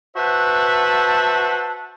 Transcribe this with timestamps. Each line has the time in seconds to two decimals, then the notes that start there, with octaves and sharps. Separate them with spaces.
0.16 F#4 B4 C5 E5 F#5 A5